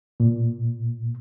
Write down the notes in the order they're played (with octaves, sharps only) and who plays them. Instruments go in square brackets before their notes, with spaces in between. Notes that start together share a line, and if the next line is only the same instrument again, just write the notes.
[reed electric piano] A#2